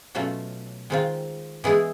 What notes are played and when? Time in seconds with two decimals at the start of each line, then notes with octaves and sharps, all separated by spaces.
0.15 B2 F#3 A3 C#4 F4
0.90 D#3 G#3 C4 F4
1.64 E3 G#3 B3 E4 G#4